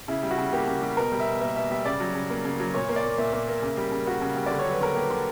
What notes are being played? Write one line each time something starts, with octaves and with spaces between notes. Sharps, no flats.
C#3 E4
G3
F#4
C#3
A#3 G4
C#3
G3
B2 A#4
G3
E5
B2
A#3 E5
B2 E5
G3 E5
C#3 D5
F#3
C#3
A#3
C#3
F#3
A#2 C#5
A#3
D5
A#3
A#2 E5
A#2
A#3
C#3
G3
C#3
A#3 F#4
C#3
G3
D3 D5
C#5
F#3 B4
D3 A#4
A#3 G4
D3